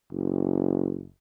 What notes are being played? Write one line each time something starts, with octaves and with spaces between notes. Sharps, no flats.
F#1